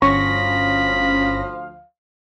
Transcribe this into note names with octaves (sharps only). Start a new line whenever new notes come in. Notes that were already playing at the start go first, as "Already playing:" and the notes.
G1 D2 F3 C#4 F5 B5 C#6 A#6